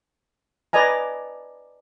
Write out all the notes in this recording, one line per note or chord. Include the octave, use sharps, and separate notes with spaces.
B4 D5 D#5 G#5 A#5